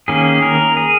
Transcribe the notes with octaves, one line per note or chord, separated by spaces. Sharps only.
D#3 A#3 C#4 G#4
A#4
G#4